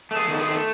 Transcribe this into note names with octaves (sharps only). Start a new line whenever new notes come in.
A3
G#4
D#3
G#4
A3